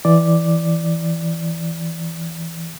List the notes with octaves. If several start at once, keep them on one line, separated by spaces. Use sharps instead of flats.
E3 D5